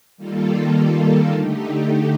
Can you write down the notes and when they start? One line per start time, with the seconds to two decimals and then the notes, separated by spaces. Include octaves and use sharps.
0.17 D#3 G3 A#3 F4 A4
1.31 D3 A3 D#4 G4